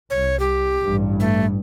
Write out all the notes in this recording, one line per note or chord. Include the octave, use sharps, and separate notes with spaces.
C2 C#5
G4
A1 G2
A3